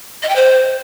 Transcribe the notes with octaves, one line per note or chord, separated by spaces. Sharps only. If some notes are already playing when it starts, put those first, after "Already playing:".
D#5
G5
C5